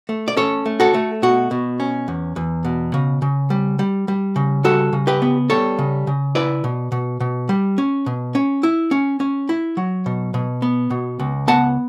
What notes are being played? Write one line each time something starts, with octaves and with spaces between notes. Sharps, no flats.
A3
D5
C#4 A4 C#5
A3
F#4 A4
A3
B2 F#4
B2
C#4
E2
E2
B2
C#3
C#3
G3
G3
G3
C#3
G3 F#4 A4
C#3
G4 B4
B3
G3 A4 C#5
C#3
C#3
E4 B4 D5
B2
B2
B2
G3
C#4
B2
C#4
E4
C#4
C#4
E4
F#3
B2
B2
B3
B2
C#2
B3 F#5 A5